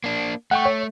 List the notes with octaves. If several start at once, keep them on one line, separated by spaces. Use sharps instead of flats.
A#3 D4
A3 F#5 G5 C#6
C#5